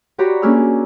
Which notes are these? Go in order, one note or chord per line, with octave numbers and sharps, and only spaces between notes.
F#4 G4 C#5 D5 A#5 B5
A#3 C#4 D4 G#4 E6 F6